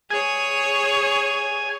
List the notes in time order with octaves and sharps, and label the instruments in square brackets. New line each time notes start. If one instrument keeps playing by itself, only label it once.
[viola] G#4 C#5 [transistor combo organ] G#5